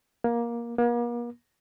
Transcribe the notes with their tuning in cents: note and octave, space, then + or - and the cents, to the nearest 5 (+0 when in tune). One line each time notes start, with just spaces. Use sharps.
A#3 +15
A#3 +40